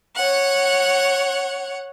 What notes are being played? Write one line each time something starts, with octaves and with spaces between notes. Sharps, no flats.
C#5 F#5